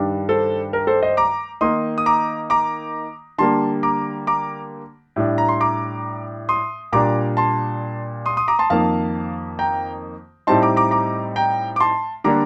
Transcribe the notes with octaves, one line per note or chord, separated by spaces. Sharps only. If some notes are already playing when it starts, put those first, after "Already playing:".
Already playing: G2 D#3 G3 D4
A4 C5
A#4
A4 C5
C5 D#5
A#5 D6
D#3 A#3 D#4 C6 D#6
D#6
A#5 D6
A#5 D6
D3 G3 A#3 A5 C6
A#5 D6
A#5 D6
A2 G3 D4
A#5
C6
A#5 D6
C6 D#6
A#2 G3 D4 A#5 D6
A5 C6
C6 D#6
C6 D#6
A#5 D6
A5 C6
F2 D#3 A#3 F5 A5
G5 A#5
A2 G3 C4 D#4 A5 C6
A#5 D6
A#5 D6
A#5 D6
G5 A#5
D6
A5 C6
D3 G3 A#3 D4 A#5 D6